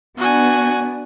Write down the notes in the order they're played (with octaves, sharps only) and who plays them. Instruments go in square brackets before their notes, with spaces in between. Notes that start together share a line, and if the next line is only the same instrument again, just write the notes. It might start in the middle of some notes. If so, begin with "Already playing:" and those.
[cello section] B3 D4 [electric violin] F#4 G#5